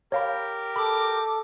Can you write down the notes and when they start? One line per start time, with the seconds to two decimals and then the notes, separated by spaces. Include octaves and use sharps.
0.12 G4 A#4 C#5 F5 B5
0.76 A4 B5 D6